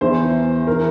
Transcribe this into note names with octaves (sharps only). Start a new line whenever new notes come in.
E2 E3 C5
E3 A#4